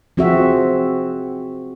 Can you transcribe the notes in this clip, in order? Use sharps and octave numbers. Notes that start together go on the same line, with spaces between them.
F3 C4 F#4 G#4 E5